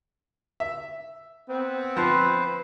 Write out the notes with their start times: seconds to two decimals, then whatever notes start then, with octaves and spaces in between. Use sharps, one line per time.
0.60 E5
1.49 B3 C4
1.97 F3 B4 C5